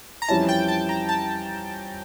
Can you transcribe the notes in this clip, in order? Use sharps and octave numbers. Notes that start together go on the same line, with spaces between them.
A#5
F2 E3 G3 C#4 E4 A5
G5
A5
A#5
A5